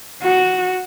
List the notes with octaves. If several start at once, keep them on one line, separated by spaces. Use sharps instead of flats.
F#4